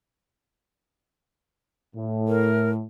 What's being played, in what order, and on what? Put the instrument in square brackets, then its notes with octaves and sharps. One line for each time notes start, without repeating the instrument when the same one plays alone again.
[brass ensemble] A2
[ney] A#4